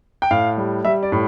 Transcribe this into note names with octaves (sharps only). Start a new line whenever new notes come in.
G5
A2 F5
G3
G3 E5
D5
A2